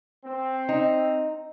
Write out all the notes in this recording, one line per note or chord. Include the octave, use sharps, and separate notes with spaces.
C4
D#4